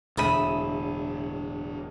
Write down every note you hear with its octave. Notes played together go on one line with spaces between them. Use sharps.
E1 A2 D3 E5 B5 D#6 D#7